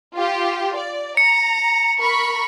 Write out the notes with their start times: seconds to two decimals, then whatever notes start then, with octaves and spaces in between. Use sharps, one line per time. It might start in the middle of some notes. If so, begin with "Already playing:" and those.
0.16 F4 G4
0.76 D5
1.17 A#5 C#7
2.00 A#4 B5 C#6